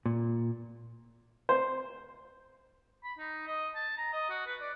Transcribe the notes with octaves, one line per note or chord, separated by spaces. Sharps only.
A#2
C5
B5
D#4
D#5
A5
A#5
D#5
F#4
B4
D5